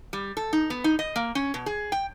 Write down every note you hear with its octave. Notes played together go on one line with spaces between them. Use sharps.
G3
A4
D#4
B3
D#4
D#5
A#3
C#4
B2
G#4
G5